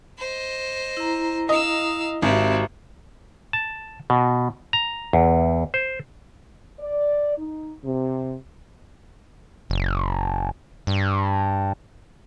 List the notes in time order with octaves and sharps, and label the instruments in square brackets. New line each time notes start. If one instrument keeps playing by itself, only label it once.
[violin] C5 D#5
[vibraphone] E4 A#5
[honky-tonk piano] D#5 [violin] F5 E6
[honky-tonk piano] G#1 [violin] C4 E4 [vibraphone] F#4 G4 E5
[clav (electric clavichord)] A5
B2
A#5
E2
C5
[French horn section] D5
D#4
C3
[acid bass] F#1
G2